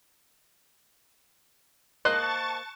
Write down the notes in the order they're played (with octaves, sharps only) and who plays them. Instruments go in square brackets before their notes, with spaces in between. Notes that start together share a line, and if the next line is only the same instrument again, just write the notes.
[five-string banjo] A#3 C5 D#5 [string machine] A5 C#6 A6 [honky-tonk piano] F#6